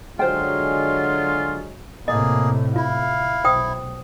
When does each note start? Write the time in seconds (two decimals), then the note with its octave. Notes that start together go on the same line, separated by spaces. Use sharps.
0.19 D3 F#3 G#3 F4 C5 G5
2.08 A2 C3 A#3 G#4 D#5
2.76 E4 F4 F5
3.44 B1 C5 G5 D#6